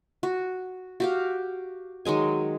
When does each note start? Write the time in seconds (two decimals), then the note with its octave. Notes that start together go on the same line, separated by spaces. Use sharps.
0.23 F#4
1.00 F#4 G4 F5
2.05 D#3 F#3 G#3 G#5